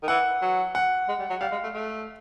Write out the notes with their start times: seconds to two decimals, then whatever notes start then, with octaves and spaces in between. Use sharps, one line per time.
0.03 D#3
0.08 E3 F#5
0.42 F#3
0.75 F#5
1.09 G#3
1.19 G3
1.30 F#3
1.41 G3 F5
1.52 G#3
1.63 A3
1.74 A3